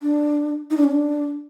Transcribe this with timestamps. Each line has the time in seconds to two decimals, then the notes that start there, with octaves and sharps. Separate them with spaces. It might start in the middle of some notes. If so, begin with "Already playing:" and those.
0.02 D4
0.71 D#4
0.77 D4
0.84 C#4
0.91 D4